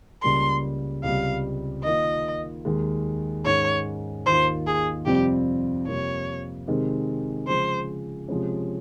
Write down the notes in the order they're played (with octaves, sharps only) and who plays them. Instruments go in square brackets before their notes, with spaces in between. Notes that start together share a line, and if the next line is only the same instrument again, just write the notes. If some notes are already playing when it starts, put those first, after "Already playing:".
[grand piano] C#2 C#3 G3 A#3 [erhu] C6
[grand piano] C#2 C3 G3 [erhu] F5
[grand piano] D#3 A#3 F4 [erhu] D#5
[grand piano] D#2 D#3 G#3
[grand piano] G#2 D#3 G#3 C#4 [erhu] C#5
[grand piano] D#2 D#3 A#3 F4 [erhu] C5
[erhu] G#4
[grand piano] F2 C3 G3 C4 F4 [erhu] G4
[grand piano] F2 C3 G3 A#3 F4 [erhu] C#5
[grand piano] C3 D#3 G#3 C4
[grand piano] C#3 F3 G#3 [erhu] C5
[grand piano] C3 F3 G#3 C#4